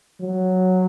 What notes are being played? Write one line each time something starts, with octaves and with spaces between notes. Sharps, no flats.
F#3